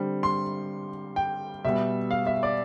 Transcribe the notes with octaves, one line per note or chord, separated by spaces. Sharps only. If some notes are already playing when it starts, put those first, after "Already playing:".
Already playing: D3 G3 C4
C6
G5
B2 G3 B3 E5
F5
E5
D5